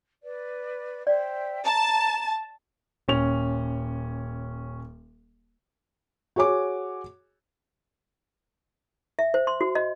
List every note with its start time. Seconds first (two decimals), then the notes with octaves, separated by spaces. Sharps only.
0.23 B4 D5
1.07 C5 D5 E5 G5
1.65 A5 A#5
3.08 D#1 C#4 F7
6.36 F#4 G#4 C#5 G#5 D6
9.19 E5
9.34 C5
9.47 C6
9.61 F#4
9.75 D#5